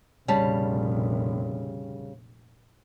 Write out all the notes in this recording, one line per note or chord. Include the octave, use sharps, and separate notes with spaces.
F1 A#1 C#3 G3 A5